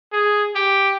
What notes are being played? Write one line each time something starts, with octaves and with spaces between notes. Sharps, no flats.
G#4
G4